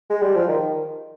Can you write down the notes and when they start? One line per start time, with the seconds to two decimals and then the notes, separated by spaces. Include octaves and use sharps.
0.10 G#3
0.22 G3
0.35 F3
0.48 D#3